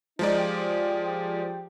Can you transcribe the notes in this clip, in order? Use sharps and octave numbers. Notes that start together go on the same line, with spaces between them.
F3 G#3 D#4 D5
G4
G4